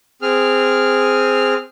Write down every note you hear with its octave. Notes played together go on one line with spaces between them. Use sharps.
C4 G#4 F6